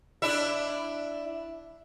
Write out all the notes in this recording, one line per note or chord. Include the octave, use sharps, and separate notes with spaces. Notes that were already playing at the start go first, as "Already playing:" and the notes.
D4 E4 E5